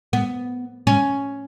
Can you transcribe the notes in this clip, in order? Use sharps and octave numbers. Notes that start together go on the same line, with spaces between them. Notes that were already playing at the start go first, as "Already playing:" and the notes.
B3
C#4